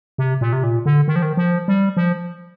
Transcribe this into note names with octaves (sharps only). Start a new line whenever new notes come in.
C3
A#2
C3
A#2
D3
D#3
F3
D#3
F3
G3
F3